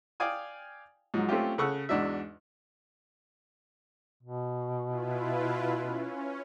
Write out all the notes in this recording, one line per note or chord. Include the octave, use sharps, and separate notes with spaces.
D5 F5 G5 G#5 D#6
G#2 F3 F#3
A3 C4 C#4 F4 G4
C#3 A4 F#5 C#6 E6
E2 G#2 D4 D#4 F#4 E5
B2
E4 F4 B4
C#4